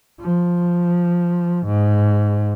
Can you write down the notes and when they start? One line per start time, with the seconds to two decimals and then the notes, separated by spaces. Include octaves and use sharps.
0.21 F3
1.66 G#2